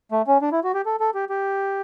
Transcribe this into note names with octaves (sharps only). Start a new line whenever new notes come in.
A3
C#4
D4
E4
F#4
G4
A4
A4
G4
G4